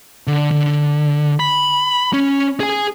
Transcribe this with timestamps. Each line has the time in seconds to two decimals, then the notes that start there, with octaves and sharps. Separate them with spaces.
0.27 D3
0.51 D3
1.40 B5
2.13 C#4
2.60 G#4 G#5